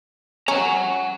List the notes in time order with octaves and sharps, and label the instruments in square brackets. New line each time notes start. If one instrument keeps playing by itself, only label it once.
[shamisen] C#4 [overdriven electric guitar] F#5 A#5